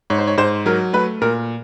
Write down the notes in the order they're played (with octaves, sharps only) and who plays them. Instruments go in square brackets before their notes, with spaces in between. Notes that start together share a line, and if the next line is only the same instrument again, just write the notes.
[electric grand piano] G#2 [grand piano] C#5
[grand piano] C5
C#5
[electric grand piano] G#2 [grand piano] C5
[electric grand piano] F#3 [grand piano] A#4
[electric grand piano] A3 [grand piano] B4
[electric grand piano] A#2 [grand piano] A#4